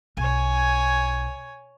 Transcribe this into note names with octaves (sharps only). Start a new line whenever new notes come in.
B1 C#5 G#5